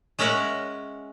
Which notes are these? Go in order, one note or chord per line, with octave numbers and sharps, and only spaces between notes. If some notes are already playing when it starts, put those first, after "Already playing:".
G#3 C#4 A#4 E5 F#5